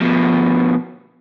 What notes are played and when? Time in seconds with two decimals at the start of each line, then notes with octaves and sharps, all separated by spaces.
0.01 B2 F3